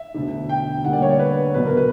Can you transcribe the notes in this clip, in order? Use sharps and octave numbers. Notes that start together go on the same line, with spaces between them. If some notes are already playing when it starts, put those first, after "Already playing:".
Already playing: E5
E1 D2 D3
G5
D2 D3 G3 A#3 F#5
D5
C#5
D5
B4
C#2 B2 F#3 B4
A#4
B4